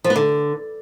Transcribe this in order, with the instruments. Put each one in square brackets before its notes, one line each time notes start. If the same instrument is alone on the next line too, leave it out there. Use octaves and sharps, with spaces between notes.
[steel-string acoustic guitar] F3
B3
D3